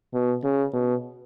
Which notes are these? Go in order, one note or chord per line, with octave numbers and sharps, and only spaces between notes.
B2
C#3
B2